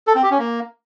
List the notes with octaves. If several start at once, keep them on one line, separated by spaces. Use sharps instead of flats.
A4
C4
G4
C#4
A#3